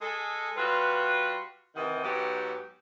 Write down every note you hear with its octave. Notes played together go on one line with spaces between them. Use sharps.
G#3 G#4 A4
G3 F4 F#4 B4
C3 D#3 E3 D#5 F#5
G#2 F#3 B3 G4